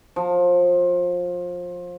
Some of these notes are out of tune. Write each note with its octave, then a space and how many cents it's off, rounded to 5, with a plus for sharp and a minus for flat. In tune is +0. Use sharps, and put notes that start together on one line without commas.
F3 +25